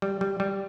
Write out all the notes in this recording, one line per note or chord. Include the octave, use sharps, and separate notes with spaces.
G3
G3
G3